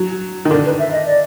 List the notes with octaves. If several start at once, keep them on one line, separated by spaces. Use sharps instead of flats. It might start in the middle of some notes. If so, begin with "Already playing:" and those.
Already playing: F#3
D#3
D3 A#4
B4
E5
D#5
D5